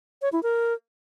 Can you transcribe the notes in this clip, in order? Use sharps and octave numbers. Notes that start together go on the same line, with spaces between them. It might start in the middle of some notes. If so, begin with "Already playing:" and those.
C#5
E4
A#4